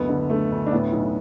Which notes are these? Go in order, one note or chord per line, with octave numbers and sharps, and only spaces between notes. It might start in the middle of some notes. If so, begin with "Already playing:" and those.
Already playing: F#1 D2 B3
D3
D3 A3
D2
D4
A2 B3
B1